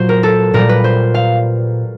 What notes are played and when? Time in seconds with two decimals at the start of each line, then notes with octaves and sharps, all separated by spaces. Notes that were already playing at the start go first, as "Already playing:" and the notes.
Already playing: A#2 F#3 C5
0.09 A#4
0.23 A4
0.54 A#2 G3 A#4
0.69 B4
0.84 C5
1.14 F5